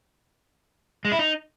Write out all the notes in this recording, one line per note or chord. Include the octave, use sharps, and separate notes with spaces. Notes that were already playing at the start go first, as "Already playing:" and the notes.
G#3
E4
D#4